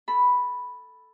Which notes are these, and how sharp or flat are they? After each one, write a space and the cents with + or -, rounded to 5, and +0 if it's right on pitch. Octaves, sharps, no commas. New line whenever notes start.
A4 +0 B5 +0